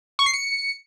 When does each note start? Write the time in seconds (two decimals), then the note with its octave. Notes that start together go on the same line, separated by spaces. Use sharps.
0.19 C#6
0.26 C7
0.34 C#7